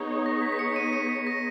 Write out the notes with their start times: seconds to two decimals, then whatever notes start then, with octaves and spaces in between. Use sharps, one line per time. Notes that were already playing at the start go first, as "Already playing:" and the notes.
Already playing: B3 D#4 G#4 C#5
0.26 A#6
0.42 B6
0.52 B6
0.59 C#7
0.76 D#7
0.87 B6
0.93 C#7
1.09 B6
1.27 A#6